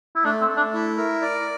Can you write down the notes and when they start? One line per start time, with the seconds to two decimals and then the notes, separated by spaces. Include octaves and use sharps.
0.16 E4
0.25 A3 D4
0.41 C4
0.48 A3
0.57 D4
0.73 E4
0.97 A#4
1.22 D5